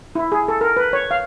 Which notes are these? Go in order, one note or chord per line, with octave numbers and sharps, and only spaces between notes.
E4
G#4
A4
A#4
B4
C#5
F5